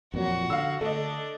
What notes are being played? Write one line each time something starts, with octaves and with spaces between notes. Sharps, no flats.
F2 A#2 F#3 F#4
D3 F5 E6
D3 A3 D4 D#5